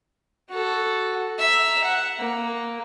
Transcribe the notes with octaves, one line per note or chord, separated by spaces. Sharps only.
F#4 A4
E5 A#5
F#5
A#3